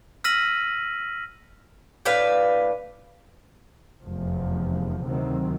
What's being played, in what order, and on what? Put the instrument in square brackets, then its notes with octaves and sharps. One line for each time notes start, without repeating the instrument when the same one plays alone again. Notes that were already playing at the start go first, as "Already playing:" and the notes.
[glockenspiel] E6 F6 A#6 B6 D#7 F#7
[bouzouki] A2 D4 B4 F5
[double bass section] F1 E2 F3
D2 C3 D#3 F#3 C4